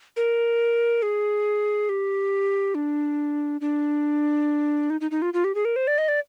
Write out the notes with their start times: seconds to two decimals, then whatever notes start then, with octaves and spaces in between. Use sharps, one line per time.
0.17 A#4
1.02 G#4
1.89 G4
2.75 D4
3.61 D4
4.90 D#4
5.01 D#4
5.11 D#4
5.22 F4
5.34 F4
5.44 G4
5.55 G#4
5.65 A#4
5.76 C5
5.87 D5
5.98 D#5
6.08 D5